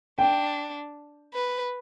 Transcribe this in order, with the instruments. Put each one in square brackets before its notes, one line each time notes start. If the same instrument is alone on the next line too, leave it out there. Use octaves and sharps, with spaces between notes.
[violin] D4 [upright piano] G5
[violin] B4